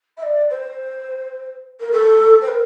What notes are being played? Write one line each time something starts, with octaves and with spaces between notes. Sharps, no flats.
E5
D5
C5
A#4
A4
C5
A#4